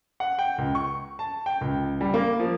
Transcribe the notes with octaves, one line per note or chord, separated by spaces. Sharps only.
F#5
G5
C#2
C#6
A5
G5
C#2
G3
A#3
F3